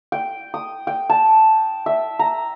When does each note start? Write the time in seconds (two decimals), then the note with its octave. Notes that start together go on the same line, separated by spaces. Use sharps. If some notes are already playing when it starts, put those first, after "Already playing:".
0.12 G5
0.54 D#6
0.87 G5
1.10 A5
1.86 E5
2.19 A#5